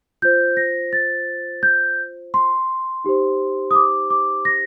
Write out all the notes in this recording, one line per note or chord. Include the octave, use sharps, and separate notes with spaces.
F4 C5 G6
A#6
A6
G6
C6
D#4 G4 C5
D#6
D6
D6
A#6